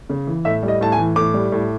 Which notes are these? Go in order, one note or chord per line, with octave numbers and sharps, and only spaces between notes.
C#3
E3
A2 E5
G3
D#5
A2 A5
G#5
E3
A2 D6
G3
A2